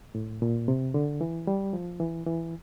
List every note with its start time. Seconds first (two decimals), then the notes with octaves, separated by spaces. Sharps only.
0.15 A2
0.42 A#2
0.68 C3
0.94 D3
1.21 E3
1.47 G3
1.73 F3
2.00 E3
2.27 E3